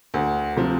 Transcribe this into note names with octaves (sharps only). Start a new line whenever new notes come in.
D2
C3 F3